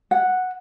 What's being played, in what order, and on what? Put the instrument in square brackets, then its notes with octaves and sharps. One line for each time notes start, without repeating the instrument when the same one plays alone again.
[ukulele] F#5